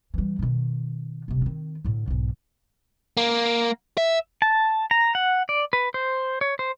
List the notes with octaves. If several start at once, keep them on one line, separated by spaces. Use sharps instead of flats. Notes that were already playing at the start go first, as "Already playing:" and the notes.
E3 G3
B2 D#3
D#1 C3
D#3 C4
A2 D3
B1 G#2
A#3
E5
A5
A#5
F#5
D5
B4
C5
C#5
C5